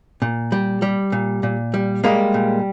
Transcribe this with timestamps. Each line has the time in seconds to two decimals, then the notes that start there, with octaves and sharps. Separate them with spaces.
0.22 A#2
0.52 G3
0.82 G3
1.12 A#2
1.43 A#2
1.74 G3
2.04 G3 G#3 A#3
2.34 A#2